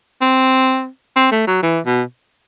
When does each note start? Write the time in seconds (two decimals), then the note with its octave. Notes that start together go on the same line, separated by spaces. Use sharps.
0.21 C4
1.16 C4
1.31 A3
1.47 F#3
1.63 E3
1.86 B2